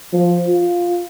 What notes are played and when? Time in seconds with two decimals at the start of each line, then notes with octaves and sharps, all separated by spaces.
0.13 F3
0.48 F4